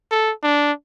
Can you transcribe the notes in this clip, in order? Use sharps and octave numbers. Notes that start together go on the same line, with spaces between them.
A4
D4